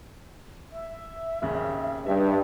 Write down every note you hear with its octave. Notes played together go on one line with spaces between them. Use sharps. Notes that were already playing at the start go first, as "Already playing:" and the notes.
E5
G#1 D#2 C#3
G2 D#5 E5